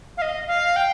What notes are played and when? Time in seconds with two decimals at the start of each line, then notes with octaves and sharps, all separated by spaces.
0.17 F5
0.22 D#5
0.48 F5
0.76 G5